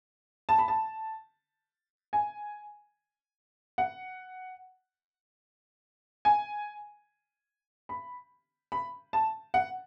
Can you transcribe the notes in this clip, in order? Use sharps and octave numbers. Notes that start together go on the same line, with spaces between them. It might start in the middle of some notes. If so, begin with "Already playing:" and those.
A5
B5
A5
G#5
F#5
G#5
B5
B5
A5
F#5